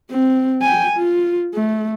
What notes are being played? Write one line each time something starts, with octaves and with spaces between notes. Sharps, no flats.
C4
G5 G#5
F4
A3